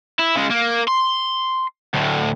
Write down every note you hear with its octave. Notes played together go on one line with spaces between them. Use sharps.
E4
C#3 G#3
A#3
C6
D2 A2